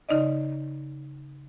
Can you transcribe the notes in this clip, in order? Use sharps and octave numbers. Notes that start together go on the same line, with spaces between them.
C#3 D#4 D5 D#5